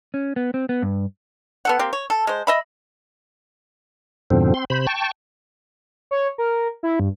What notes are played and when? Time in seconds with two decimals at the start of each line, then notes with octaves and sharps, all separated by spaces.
0.14 C#4
0.36 B3
0.54 C4
0.69 B3
0.82 G2
1.65 B3 A4 F#5
1.79 A#3 C4 G4
1.93 C#5
2.10 A4
2.27 G#3 C5
2.47 D#5 E5 B5
4.31 F2 G#2 B2 D3 F3 C4
4.54 C4 C6
4.70 C3 C5 B5
4.87 G5 A5 C#6
6.11 C#5
6.38 A#4
6.83 E4
7.00 G2